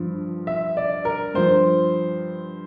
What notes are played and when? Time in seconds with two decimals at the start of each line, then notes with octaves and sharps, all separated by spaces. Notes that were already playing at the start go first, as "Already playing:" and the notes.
Already playing: G2 F3
0.47 E5
0.77 D5
1.05 A#4
1.34 G2 F3 C5